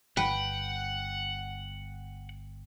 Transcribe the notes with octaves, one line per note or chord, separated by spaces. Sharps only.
G1 B4 F#5 G5